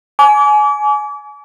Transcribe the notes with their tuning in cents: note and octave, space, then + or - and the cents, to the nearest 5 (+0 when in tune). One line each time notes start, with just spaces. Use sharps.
G#5 +25 D6 -35